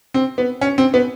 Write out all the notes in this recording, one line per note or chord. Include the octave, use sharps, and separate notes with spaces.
C4
B3
C#4
C4
B3